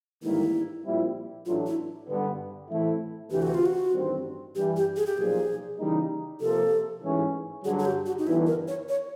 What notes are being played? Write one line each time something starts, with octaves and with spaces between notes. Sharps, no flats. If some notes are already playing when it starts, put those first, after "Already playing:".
A1 G#2 D#3 G3 A#3 E4
A#1 A#2 G3 C4 E4
A1 A2 F#3 A3 D4 F4
E4
G2 D3 G3 B3
A2 E3 A3 C4 E4
D2 C3 E3 G4
F#4
F4
F#4
A1 G2 D#3 G3 C4
G2 E3 G3 G4
G4
G#4
G4
B1 A#2 F3 G#4
C#3 E3 G3 A#3 D#4
C3 F3 A#3 A4
A1 G#2 E3 G#3 C#4
G2 D3 F#3 G#4
G#4
G4
F#4
D#4
G1 G2 E3 E4
A#4
C#5
C#5